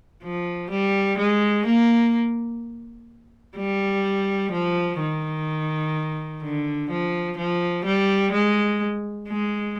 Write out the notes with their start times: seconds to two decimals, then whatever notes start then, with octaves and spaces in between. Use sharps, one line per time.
0.24 F3
0.71 G3
1.18 G#3
1.66 A#3
3.56 G3
4.52 F3
5.00 D#3
6.43 D3
6.90 F3
7.38 F3
7.85 G3
8.33 G#3
9.28 G#3